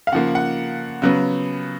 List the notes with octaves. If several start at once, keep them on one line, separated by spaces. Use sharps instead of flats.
F5
C#3 F3 A#3 F#5
F#5
C#3 F#3 B3